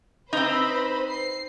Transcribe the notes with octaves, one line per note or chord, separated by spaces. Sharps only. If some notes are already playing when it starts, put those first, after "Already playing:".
C4 D#4 B4 C5 B5
C7